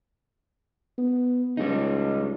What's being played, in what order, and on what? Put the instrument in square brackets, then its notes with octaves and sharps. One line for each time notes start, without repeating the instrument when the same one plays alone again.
[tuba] B3
[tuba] C#2 [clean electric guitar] G3 D#4